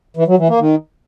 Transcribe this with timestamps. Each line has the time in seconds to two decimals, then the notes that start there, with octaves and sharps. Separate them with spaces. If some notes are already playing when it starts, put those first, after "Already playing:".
0.17 E3
0.28 F#3
0.38 E3
0.49 A#3
0.60 D#3